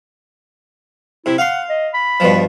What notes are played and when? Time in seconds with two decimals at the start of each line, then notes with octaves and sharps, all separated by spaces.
1.26 C3 E4
1.38 F5 F#5 C6
1.69 D#5
1.94 B5
2.20 G2 B2 F3